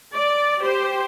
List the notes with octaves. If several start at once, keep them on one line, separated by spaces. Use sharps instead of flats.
D5
G4 C5